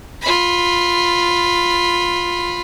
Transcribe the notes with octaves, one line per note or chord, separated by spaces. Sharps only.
F4 B5